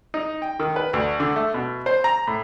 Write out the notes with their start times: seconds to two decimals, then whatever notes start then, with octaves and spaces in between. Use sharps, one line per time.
0.14 D#4
0.42 G5
0.60 D#3
0.76 B4
0.93 D2
1.20 D3
1.36 A3
1.54 B2
1.86 C5
2.04 A#5
2.27 A2